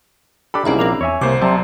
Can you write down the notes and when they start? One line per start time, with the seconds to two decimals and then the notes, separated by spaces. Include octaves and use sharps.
0.54 D4 G4 A4 B5 D6
0.65 C2 F#3 A#3 C#4 D#4 E4 G#4 E5
0.79 A#1 A#3 C4 D4 F7
1.01 E2 C#5 E5 G#5
1.21 C2 C3 A#3 C5 D6
1.42 C3 F#3 D5 A5 A#5